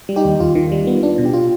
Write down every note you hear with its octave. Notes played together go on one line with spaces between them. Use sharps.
G3
D#4 G4
D#2
D#2 F4
D#3
G3
B3
D4
B2
G4
B2 F4